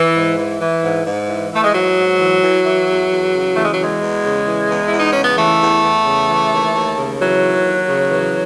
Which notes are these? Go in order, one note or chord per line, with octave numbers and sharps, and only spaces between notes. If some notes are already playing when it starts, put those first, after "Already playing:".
Already playing: E3
G#2
E3
E3
G#2
G#2
E3
E3 A3
G#3
G#2 F#3
G#2
E3
E3
E3
E2
E2
C#3
E3 A3
G#3
F#3
E2 G#3
E2
C#3
E3
E2
E4
E2
D#4
C#3 C#4
B3
E3 A3
E2
E2
C#3
E3
D#2
D#2
C#3
E3 F#3
D#2
D#2
C#3
E3